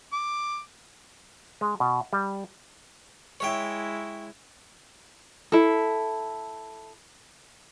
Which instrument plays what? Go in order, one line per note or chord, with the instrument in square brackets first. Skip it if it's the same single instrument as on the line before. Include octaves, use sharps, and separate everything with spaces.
[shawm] D6
[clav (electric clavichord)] G#3
B2
G3
[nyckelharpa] G#3 E4 [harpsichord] C#5 E5 G5
[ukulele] E4 A4